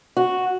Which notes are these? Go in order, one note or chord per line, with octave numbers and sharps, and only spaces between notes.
F#4